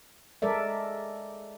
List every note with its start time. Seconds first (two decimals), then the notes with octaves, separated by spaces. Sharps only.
0.42 G#3 A4 A#4 D5 E5